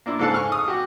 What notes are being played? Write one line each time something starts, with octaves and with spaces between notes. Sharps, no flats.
A#3 D4 E4 F4
G#2 C#3 A4 F5 A5 F#6
G#5 C#6 F6
D#6
F#4 G4